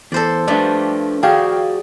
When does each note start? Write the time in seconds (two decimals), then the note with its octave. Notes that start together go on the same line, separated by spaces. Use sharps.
0.12 E2 A4 C5 D5
0.48 F3 A3 D4 B4 D5
1.23 F#4 G#4 D5 F5 G5